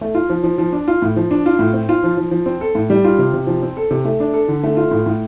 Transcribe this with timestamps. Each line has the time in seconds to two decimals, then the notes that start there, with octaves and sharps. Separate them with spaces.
0.01 A3
0.15 F4
0.30 F3
0.44 F3
0.58 F3
0.73 D4
0.88 F4
1.02 A2
1.16 F3
1.31 D4
1.46 F4
1.59 A2
1.74 C4
1.89 F4
2.04 F3
2.17 F3
2.31 F3
2.46 C4
2.61 A4
2.75 A2
2.90 G3
3.04 F4
3.18 C3
3.33 C3
3.47 F3
3.62 C4
3.77 A4
3.91 C3
4.05 A3
4.20 D4
4.34 A4
4.48 D3
4.63 A3
4.77 F4
4.91 A2
5.06 A2